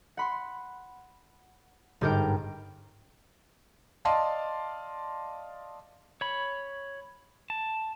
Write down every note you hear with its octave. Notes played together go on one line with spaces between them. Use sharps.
F#5 B5 C6
G1 G#2 G4 A#4 G5 D7
D5 D#5 F5 A5 C6
C#5 B5
A5